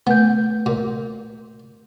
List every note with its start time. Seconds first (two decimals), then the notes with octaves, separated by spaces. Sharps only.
0.07 A3 B3 G6
0.66 A#2